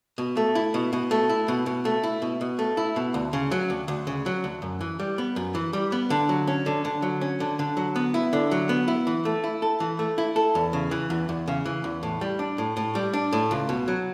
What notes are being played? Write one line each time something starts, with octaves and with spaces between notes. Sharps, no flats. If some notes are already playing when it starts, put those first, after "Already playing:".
B2
A3
E4
B2
B2
A3
E4
B2
B2
A3
E4
B2
B2
A3
E4
B2
D2
C#3
F#3
D2
D2
C#3
F#3
D2
F#2
E3
G3
B3
F#2
E3
G3
B3
D3
F#3
C#4
D3
D3
F#3
C#4
D3
D3
F#3
B3
E4
D3
F#3
B3
E4
E3
A3
E4
A4
E3
A3
E4
A4
E2
C#3
E3
E2
E2
C#3
E3
E2
A2
G3
D4
A2
A2
G3
D4
A2
C#2
B2
F#3